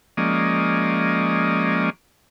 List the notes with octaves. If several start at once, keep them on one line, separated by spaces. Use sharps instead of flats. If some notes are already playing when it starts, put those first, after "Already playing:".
F3 G#3 A#3 C#4 D5 D#5